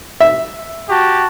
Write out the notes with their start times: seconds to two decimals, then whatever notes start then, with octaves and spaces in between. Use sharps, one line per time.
0.20 E5
0.89 F#4 G4 A5